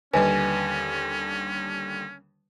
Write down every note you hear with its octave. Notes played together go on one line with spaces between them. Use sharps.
D#2 D3 G3 C#4 B4 D#5 G#5